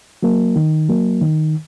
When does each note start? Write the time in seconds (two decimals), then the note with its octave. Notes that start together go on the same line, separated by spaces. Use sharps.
0.23 F#3 A#3
0.56 D#3
0.89 F#3 A#3
1.21 D#3